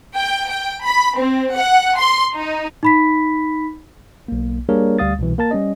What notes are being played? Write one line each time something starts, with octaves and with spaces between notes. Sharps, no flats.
G5
G5
B5
C4
F#5
C6
D#4
D#4 B5 B6
B1 A#3
G3 A#3 D4 G#4 A#4 C#5
D2 G3 F5 D#6 A6
C2 B2 E3
A#3 A#4 A5 A6
G3 C#4 D#5